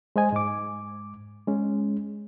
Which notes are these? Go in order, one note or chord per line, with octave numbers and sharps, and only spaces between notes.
G#3 C5 D#5 G#5
G#2 D6
G#3 C#4